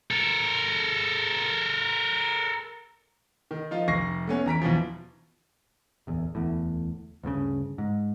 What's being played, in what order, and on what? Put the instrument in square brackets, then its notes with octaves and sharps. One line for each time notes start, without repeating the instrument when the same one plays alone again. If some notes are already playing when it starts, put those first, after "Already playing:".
[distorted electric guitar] A4 A#4
[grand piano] D#3
F3 D#4 F4
F1 C#6 A#6 C7
A3 B3 C#4
E2 A#5 B6 D7
E2 B2 E3 F3
[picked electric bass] D1 E2
D1 E2 A2
D2 G2 A#2 C#3
G#2